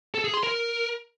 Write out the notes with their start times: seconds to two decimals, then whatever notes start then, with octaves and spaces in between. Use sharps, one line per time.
0.14 A4
0.24 G#4
0.34 C6
0.43 A#4